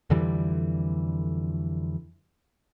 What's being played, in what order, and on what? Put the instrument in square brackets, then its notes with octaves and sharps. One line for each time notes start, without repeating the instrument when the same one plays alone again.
[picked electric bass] F2 D3 E3 G3